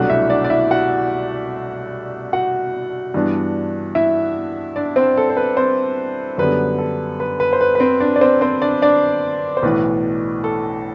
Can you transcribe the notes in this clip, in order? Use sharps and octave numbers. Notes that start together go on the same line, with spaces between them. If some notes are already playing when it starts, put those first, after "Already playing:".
Already playing: C2 B2 F#3 A3 D4 F#4 F#5
E4 E5
D4 D5
D5
E4 E5
F#4 F#5
F#4 F#5
G2 E3 B3 D4
E4 E5
D4 D5
C4 C5
A4
C5
B4
C4 C5
F#2 D3 G3 B3 B4
A4
B4
B4
C5
B4
B4
C4 C5
D4 D5
D5
C4 C5
C4 C5
D4 D5
D4 D5
C5
B1 A2 E3 B4
A4